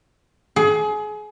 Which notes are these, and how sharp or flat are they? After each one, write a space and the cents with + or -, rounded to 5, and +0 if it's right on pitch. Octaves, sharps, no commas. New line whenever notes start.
G#4 +30